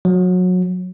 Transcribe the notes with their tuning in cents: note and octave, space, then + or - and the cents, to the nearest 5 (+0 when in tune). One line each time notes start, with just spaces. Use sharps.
F#3 -25